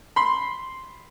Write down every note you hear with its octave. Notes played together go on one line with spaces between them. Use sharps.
B5 C6